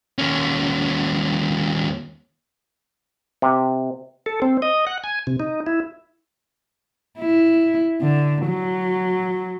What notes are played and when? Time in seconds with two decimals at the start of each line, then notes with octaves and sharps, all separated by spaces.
0.19 D#2 C#4
3.42 C3
4.26 A4
4.42 C4
4.62 D#5
4.87 F#5
5.04 G#5
5.27 C3
5.40 D#4
5.66 E4
7.19 E4
8.01 D3
8.47 F#3